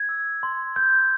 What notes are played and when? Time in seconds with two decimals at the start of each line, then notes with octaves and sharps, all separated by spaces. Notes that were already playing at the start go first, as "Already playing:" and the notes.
Already playing: G#6
0.09 E6
0.43 C6
0.76 G6